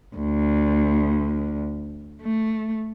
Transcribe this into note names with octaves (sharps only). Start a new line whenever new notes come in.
D2
A3